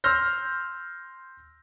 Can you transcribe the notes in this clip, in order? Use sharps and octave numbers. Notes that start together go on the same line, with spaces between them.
C6 E6 F6 G6 A#6